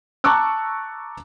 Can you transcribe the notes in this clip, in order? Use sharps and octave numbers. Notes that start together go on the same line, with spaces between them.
A5 A#5 C#6 D6 E6 F#6